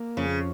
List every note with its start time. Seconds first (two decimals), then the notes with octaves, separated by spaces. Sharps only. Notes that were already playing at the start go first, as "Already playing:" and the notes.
Already playing: A#3
0.17 F2 C#3